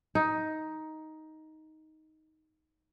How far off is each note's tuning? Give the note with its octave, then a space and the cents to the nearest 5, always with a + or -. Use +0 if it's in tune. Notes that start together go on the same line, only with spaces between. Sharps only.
D#4 +10